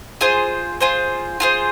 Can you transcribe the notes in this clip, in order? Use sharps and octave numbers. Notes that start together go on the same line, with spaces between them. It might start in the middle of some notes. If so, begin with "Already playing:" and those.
F4 G#4 C5
F4 G#4 C5
F4 G#4 C5